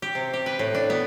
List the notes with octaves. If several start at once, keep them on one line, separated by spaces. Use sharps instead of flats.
G4
C3
G4
B4
A2
D4
B3